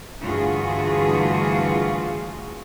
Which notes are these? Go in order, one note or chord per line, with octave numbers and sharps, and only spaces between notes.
D2 G2 E3 F4 F#4 G#4